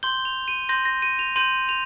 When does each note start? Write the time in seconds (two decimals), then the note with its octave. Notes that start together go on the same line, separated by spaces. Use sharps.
0.03 C6 G6 G7
0.25 F7
0.48 D#7
0.69 C6 G6 A#6
0.85 A#6
1.02 D#7
1.19 F7
1.36 C6 G6 D#7
1.69 F7